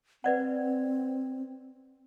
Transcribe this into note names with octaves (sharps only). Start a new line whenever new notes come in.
C4 B4 D5 F#5